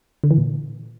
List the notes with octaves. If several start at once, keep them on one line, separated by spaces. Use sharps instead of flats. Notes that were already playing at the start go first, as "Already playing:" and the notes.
D3
E3
A#2